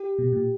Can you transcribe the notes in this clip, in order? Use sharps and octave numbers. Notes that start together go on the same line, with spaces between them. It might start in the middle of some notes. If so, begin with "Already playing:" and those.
Already playing: G4
B2
A#2